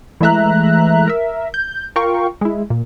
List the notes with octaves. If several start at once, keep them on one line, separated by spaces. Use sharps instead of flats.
E3 G#3 A3 E5 A#5 F#6
A#4 E5
G6
F4 A#4 F5 G5 C#6
G#3 E4
A#2